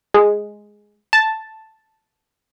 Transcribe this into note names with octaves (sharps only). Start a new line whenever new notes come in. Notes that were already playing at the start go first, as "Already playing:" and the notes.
G#3
A5